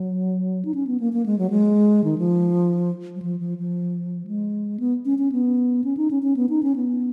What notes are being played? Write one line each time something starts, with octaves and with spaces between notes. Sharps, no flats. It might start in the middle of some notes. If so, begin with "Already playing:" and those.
Already playing: F#3
D#4
C#4
B3
A#3
A#3
G#3
F#3
G#3
D#3
F3
F#3
F3
F3
F3
G#3
B3
C#4
C#4
B3
C#4
D#4
C#4
C#4
B3
D#4
C#4
B3